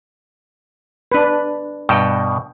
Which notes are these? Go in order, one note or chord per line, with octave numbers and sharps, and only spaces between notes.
D4 B4
G2 B2 G5